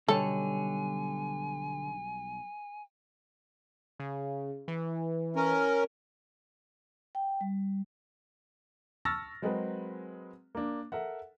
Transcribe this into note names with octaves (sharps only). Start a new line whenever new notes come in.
B1 D3 G3 A4 C#5 G#5
C#3
E3
C#4 A#4
G5
G3
A5 C#6 E6 F6 A6 A#6
F#3 G#3 C4 G#4 A#4 B4
A#3 D4
A4 A#4 E5 F#5